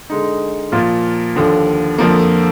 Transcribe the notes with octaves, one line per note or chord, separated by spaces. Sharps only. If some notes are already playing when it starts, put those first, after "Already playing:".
D3 G#3 D#4
A#2 F3 A#3 F4
D#2 D3 F3
F2 D3 F3 A#3